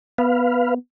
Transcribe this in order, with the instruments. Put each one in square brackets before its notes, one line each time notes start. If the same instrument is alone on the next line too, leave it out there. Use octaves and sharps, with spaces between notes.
[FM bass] B3 [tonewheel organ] B4 F5